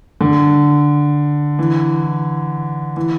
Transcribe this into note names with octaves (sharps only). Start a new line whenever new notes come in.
D3
E3
E3